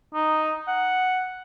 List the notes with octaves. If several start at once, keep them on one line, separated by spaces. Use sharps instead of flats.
D#4
F#5